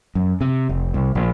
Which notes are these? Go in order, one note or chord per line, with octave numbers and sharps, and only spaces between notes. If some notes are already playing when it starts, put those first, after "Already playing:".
F#2
C3
F1
C2
A#1